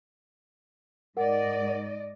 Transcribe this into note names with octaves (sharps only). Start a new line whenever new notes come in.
G#2 A#4 D5 D#5 F#5